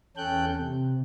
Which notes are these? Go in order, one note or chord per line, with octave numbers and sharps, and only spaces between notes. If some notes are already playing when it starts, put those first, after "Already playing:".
E2 C#4 A4 G5 F#6 G6
C3